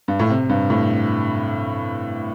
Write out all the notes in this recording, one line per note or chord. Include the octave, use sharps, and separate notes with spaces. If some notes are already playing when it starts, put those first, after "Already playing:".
G2
A2
C3
G2
A2